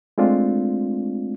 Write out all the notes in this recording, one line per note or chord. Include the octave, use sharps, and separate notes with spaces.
G#3 A3 C4 D4 F4